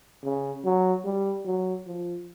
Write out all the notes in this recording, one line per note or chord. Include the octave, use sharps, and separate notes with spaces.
C#3
F#3
G3
F#3
F3